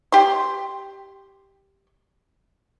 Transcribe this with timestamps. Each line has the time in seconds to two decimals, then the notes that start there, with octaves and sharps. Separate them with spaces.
0.12 G4 C6